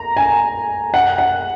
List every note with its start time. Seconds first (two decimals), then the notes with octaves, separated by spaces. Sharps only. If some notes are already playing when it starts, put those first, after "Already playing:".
Already playing: A#5
0.17 G#5
0.94 F#5
1.18 F#5